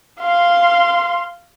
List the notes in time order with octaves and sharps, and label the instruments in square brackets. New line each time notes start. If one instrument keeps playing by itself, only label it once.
[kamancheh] F5 C6